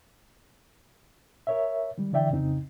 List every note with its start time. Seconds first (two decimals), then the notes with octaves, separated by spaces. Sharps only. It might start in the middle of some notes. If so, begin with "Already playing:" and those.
1.47 A#4 C#5 E5
1.98 D#3 G3
2.13 D3 E3 D5 E5 G5
2.31 C2 F2 C#3 C4 D#4